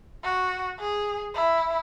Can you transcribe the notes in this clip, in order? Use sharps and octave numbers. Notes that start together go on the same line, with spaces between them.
F#4
G#4
E4